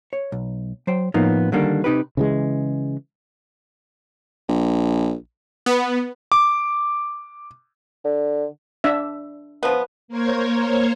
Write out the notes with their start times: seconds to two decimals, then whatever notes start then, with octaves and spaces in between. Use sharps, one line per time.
0.13 C#5
0.32 B1
0.87 F#3 C5 G5
1.14 A2 F3 A#3 B3 D#4
1.52 D3 D#3 G3 A#3 D4
1.84 C3 D#4 G4 B4
2.17 C#3 E3 G#3
4.49 A#1
5.66 B3
6.32 D6
8.05 D3
8.84 D4 E5
9.63 F3 B3
10.08 A#3 A#4 C5 C#5 G#6